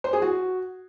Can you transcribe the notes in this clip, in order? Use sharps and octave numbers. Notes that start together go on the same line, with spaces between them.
C5
G#4
F#4